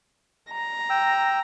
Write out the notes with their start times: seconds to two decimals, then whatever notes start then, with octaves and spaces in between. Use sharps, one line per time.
0.52 A#5
0.90 G5 E6